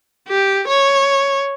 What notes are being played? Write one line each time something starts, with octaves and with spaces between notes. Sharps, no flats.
G4
C#5